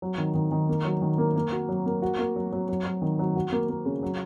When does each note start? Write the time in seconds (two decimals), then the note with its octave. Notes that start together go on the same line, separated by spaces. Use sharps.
0.02 F#3
0.18 D#3
0.35 D#3
0.52 D#3
0.69 A#3
0.85 F#3
1.02 D#3
1.18 A#3
1.36 A#3
1.52 F#4
1.69 F#3
1.86 A#3
2.02 F#4
2.18 A#3
2.36 F#3
2.52 F#3
2.69 F#3
2.85 F#3
3.02 D#3
3.19 F#3
3.36 F#4
3.52 A#3
3.69 A#3
3.86 C#3
4.03 F#3